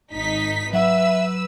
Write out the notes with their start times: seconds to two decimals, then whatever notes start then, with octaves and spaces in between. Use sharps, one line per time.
0.12 G#1 D#4 B6
0.73 F#3 B4 E5 F#5 E6